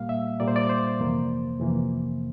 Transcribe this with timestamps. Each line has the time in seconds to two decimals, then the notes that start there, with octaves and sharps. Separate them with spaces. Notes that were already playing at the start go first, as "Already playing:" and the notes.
Already playing: A#2 G3 A#3 F5
0.09 E5
0.40 A#2 G3 A#3 D5
0.48 C5
0.56 D5
0.70 C5
0.99 F2 C3 E3 A#3
1.59 F2 C3 E3 A#3